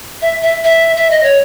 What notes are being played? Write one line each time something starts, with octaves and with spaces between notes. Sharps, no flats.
E5
E5
E5
E5
D#5
C#5